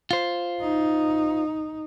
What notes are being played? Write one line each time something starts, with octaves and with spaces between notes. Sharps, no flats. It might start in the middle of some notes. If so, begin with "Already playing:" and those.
F4 C5
D#4